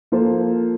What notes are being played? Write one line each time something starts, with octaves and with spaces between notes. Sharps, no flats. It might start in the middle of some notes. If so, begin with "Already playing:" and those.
F3 A#3 F4 A4 C5